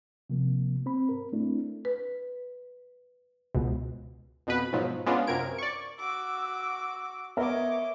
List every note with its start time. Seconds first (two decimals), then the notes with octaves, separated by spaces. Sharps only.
0.30 C3 F3 A#3
0.86 C4 B5
1.09 G#2 A#4
1.33 A3 C4 D4 E4
1.85 B4
3.55 C#2 B2
4.47 F2 B2 B4
4.73 G#2 B2 F3 F#3
5.06 G#3 B3 C#4 D4 F4
5.27 F#2 C3 A#4 G#6 D7
5.58 D5 C#6
5.99 F#4 D6 E6
7.37 B3 A#4 C#5 D#5 E5 D6